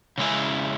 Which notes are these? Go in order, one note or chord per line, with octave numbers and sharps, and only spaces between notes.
C#3 G#3 C#4 E4